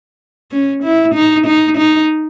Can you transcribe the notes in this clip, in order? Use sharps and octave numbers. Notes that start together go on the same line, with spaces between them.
C#4
E4
D#4
D#4
D#4